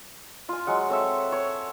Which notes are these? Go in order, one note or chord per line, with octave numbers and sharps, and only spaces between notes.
F4 G#5
F#3 G#3 F#5
C4 A4 C#5 E5
C#5